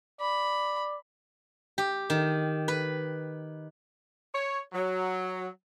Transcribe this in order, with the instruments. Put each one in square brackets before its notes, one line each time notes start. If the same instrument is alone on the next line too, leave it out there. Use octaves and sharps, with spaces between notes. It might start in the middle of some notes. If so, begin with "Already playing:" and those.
[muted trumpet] D5 [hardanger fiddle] B5
[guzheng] G4
D#3
B4
[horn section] C#5
F#3